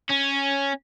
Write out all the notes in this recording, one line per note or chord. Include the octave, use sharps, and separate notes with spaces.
C#4